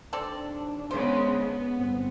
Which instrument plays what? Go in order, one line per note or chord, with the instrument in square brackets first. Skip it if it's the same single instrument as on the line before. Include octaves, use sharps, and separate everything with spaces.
[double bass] D#2 D4 [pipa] C4 A4 D5
[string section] C#3 G#3 B3 [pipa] C5
[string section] B3
[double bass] G1 C4